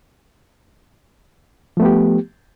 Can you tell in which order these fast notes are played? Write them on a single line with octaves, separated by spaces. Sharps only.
F3 A3 B3 G4